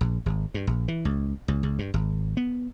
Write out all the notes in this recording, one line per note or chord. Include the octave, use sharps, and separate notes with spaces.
A#1
G#1
G2
A#1
E3
C#2
C#2
C#2
G2
G#1
B3